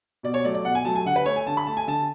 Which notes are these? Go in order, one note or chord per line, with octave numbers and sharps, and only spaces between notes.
B2 D5
C#5
F#3 A3 D5
D5
B2 F#5
G#5
F#3 A3 A5
G#5
D3 F#5
B4
A3 C#5
G#5
D3 A5
B5
A3 A5
G#5
D3 A5